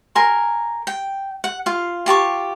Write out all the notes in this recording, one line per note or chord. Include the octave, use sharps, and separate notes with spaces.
A#4 G#5 C6
G5
F#5
F4 F5
F4 G4 A5 C#6